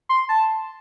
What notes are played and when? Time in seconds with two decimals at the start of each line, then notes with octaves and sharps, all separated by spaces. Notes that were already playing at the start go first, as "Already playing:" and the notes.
0.09 C6
0.29 A5